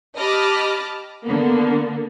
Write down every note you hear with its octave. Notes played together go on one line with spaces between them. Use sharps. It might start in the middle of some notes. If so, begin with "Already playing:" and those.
G4 D#5 A5 B5 D6 F6
D3 A#3 B3